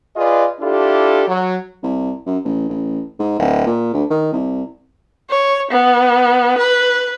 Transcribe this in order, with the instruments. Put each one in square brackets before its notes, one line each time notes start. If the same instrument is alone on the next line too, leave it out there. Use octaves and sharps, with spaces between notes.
[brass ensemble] F4 G#4 B4 D5 D#5
D4 E4 F4 G4 A4
F#3
[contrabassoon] C2
F#2
A1
A1
G#2
D1
A#2
D2
D#3
C2
[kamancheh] C#5
B3
B4